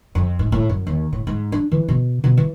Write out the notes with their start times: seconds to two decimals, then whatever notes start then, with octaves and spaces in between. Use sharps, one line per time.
0.15 F2
0.39 G#2
0.52 A2
0.69 F#2
0.87 D#2
1.13 A2
1.27 G#2
1.52 D4
1.72 E3
1.88 B2
2.24 B2
2.37 E3